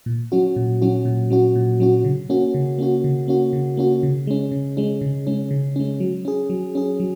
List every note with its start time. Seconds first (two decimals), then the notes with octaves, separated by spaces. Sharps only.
0.06 A#2
0.32 F#3 C#4 F#4
0.56 A#2
0.82 F#3 C#4 F#4
1.05 A#2
1.30 F#3 C#4 F#4
1.56 A#2
1.80 F#3 C#4 F#4
2.04 C#3
2.29 A#3 C#4 F#4
2.54 C#3
2.78 A#3 C#4 F#4
3.04 C#3
3.28 A#3 C#4 F#4
3.53 C#3
3.77 A#3 C#4 F#4
4.03 C#3
4.27 G#3 C#4
4.52 C#3
4.77 G#3 C#4
5.01 C#3
5.27 G#3 C#4
5.51 C#3
5.76 G#3 C#4
6.00 F#3
6.25 C#4 G#4
6.50 F#3
6.75 C#4 G#4
7.00 F#3